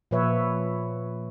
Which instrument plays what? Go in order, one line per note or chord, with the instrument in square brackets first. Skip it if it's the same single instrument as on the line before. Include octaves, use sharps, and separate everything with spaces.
[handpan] A#2 F3 B4 C#5 E5